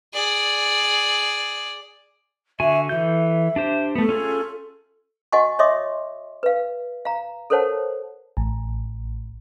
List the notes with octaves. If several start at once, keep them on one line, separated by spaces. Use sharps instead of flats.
G#4 D5
D3 F#4 E5 G#5
E3 A4 E5 G6
D4 G4 C5
A3 B3 A4
C#4 F4 G#4
F#4 D#5 F#5 G#5 C#6
C#5 D#5 E5 C6 D6 D#6
B4 F5
F5 A#5
A4 A#4 C5 C#5 F#5 A5
A1